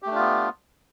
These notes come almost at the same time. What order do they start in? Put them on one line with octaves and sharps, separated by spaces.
G4 A3 D4 F4 B3